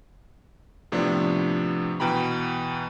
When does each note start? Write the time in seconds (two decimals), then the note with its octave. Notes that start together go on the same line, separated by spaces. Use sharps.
0.92 A2 C3 F3 B3 D4
2.00 B2 E3 G5 A#5 B5